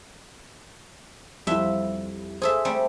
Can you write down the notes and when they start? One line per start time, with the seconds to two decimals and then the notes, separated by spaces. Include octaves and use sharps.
1.47 F2 G3 E4 E5
2.42 G#4 A4 C5 E5
2.65 G3 A3 C4